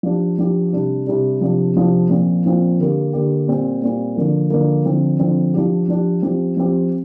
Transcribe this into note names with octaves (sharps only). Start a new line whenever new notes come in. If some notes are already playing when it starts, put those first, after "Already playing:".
F3 D4 G4
F3 D4 G4
C3 G3 D4
C3 G3 D4
C3 F3 D4 G4
C3 F3 D4 G4
A#2 F3 C4 F4
A#2 F3 C4 F4
D3 A#3 G4
D3 A#3 G4
A#2 G3 C4
A#2 G3 C4
D3 F3 A#3
D3 F3 A#3
D3 F3 C4
D3 F3 C4
F3 D4 G4
F3 D4 G4
F3 C4 G4
F3 C4 G4